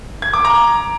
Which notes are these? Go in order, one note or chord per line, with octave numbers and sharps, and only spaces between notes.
G#6
D6
A#5